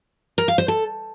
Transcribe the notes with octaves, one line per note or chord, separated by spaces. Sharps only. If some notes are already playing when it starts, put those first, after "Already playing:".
A#4
F5
C5
A4